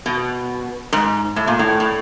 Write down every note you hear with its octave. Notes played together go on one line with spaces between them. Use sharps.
B2
G#2
A2
A#2
A2
A2